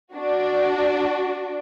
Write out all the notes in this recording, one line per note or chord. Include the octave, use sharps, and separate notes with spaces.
D4 F#4